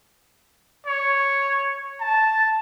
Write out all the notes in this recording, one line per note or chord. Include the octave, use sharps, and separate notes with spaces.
C#5
A5